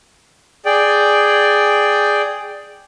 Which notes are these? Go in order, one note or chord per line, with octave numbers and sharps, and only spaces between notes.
G#4 D5 G5